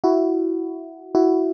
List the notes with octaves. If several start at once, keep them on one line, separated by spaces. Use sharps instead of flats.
E4 F#4
E4 F#4